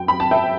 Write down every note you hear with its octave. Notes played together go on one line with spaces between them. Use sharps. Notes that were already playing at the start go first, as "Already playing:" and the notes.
Already playing: F#2 G5
B5
A5
E5 G5